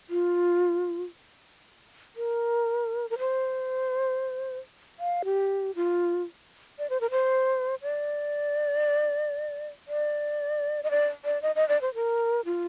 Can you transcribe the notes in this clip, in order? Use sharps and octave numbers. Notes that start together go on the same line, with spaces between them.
F4
A#4
A#4
C5
F5
G4
F4
D5
C5
A#4
C5
D5
D5
D#5
D5
D5
D#5
D#5
D5
C5
A#4
F4